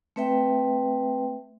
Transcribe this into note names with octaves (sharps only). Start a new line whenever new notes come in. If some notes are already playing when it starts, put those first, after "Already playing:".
A3 C4 B4 E5 G5